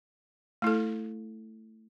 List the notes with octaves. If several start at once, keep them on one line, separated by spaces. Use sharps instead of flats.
A3 E4 A4